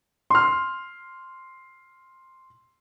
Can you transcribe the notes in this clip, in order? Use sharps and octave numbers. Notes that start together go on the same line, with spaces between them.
C6 F6